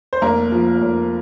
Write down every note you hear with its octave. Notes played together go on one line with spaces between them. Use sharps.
C5
F1 A#3 A#4
F3
F1